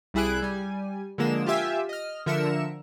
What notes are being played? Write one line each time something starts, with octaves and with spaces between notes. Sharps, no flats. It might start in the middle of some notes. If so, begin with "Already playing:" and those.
C2 G3 E4 G#4 F#6 D7
G3 G#5
D3 F3 G#3 A#3 A#4 E7
F4 G4 E5 G#5
D#5 F6
D3 F3 A#4 E5 C#7 E7